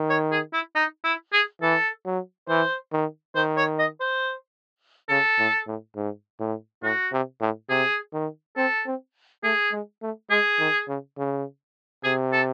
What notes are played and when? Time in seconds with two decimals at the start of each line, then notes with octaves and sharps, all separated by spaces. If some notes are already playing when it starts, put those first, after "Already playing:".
Already playing: D#3
0.10 C#5
0.32 G#4
0.53 E4
0.75 D#4
1.04 E4
1.33 G#4
1.62 E3 A4
2.06 F#3
2.48 E3 C5
2.92 D#3
3.35 D#3 C5
3.57 C#5
3.79 D#5
4.01 C5
5.09 C#3 A4
5.39 A2
5.67 A2
5.96 G#2
6.40 A2
6.82 A2 F#4
7.12 C3
7.41 A2
7.69 C3 G#4
8.13 D#3
8.57 C4 A4
8.86 C4
9.43 A3 G#4
9.72 G#3
10.02 A3
10.30 G#3 G#4
10.59 D#3
10.88 C#3
11.18 C#3
12.04 C3 G#4
12.33 A4